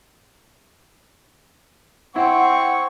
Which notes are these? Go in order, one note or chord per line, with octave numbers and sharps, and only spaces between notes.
C4 E4 F#5 C#6